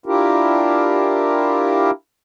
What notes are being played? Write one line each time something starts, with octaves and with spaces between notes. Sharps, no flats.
D4 E4 F4 G4 A#4